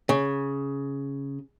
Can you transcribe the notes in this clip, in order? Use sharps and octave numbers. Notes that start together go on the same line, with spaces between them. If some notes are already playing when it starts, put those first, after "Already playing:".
C#3